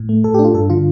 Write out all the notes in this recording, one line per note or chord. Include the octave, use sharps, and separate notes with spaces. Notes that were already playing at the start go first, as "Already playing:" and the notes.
Already playing: A2
A3
A2 A4
G4
D4
F4
G2 A4
D3 F4